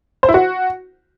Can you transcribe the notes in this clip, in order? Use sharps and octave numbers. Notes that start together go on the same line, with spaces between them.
C5
E4
F#4